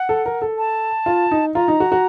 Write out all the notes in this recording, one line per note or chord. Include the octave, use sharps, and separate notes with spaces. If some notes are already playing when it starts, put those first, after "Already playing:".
Already playing: F#5
A4
A#4
A4
A5
F4
D#4
F4 A#5
D#4
F#4
F#4